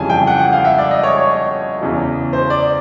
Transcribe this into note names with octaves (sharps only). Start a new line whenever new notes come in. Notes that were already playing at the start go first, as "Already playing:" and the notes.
Already playing: F2 C#3 E3 G3 G#5 A5
G5
F#5
F#5
F5
E5
D5
D#5
C#5
C#5
E2 C#3 E3
C5
D5